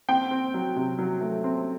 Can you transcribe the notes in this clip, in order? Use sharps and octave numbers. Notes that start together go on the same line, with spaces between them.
C4 G5
C4
F#3
C3
F#3
A3
C4